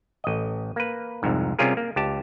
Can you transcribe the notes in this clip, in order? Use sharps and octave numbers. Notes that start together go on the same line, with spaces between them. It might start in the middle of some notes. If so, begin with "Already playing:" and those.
A1 D#5
A#3 B4
C2 F2 G#2
C3 G3 C#4 F4 G#4 A#4
A#3
C#2 G4 A5